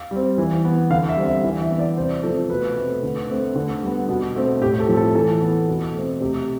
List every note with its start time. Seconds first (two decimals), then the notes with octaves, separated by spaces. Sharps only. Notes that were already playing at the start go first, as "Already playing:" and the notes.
Already playing: F5
0.11 G3 C4
0.38 E3
0.65 B3
0.90 D3 F5
1.09 E5
1.17 G3 C4
1.26 E5
1.44 E3
1.61 E5
1.70 B3
1.79 D5
1.97 C3 C5
2.23 F3 A3 C4 A4
2.50 B2 B4
2.76 A3 C4
3.03 D3
3.30 A3 C4
3.56 D3
3.83 G3 B3
4.09 B2
4.35 A3 C4
4.61 A2 G4
4.80 A4
4.89 F3 A3 C4
4.97 A4
5.15 E3 A4
5.41 B3
5.68 B2
5.94 A3 C4
6.20 C3 G4